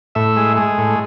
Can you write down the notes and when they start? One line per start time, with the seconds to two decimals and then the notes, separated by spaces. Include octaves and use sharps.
0.15 A2 E5
0.36 G#3
0.57 G#3
0.78 A2